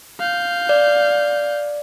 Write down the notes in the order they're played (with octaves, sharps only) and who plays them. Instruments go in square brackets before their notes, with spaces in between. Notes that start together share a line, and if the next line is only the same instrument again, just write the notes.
[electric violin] F5 G6
[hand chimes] D5